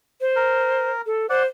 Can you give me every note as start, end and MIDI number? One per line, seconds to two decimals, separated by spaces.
0.21 0.91 72
0.36 1.01 70
1.06 1.29 69
1.29 1.46 72
1.29 1.43 74
1.29 1.43 78